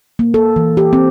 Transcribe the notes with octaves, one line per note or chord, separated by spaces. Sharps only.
A#3
A4
E3
G4
C4